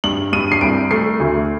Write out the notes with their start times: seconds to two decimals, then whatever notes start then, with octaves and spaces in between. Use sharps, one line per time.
0.04 G2 F#7
0.33 G2 D#7
0.52 C7
0.61 C2 D7
0.91 A3 C7
1.20 D2